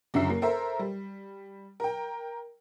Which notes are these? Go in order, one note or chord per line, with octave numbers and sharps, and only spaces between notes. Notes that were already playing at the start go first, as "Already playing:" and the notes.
F#1 F#2 D3 E5 C7
A#3
A4 A#4 C5 E5
G3
A#4 G5